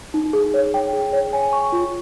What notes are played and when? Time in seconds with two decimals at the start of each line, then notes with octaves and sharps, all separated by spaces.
0.14 D#4
0.33 G#4
0.54 C#5
0.74 G5
0.93 G#4
1.13 C#5
1.33 G#5
1.53 C#6
1.72 F4